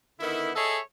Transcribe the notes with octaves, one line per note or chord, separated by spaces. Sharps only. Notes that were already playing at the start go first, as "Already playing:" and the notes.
D3 D#3 B3 E4
G#4 A4 C#5 D#5 E5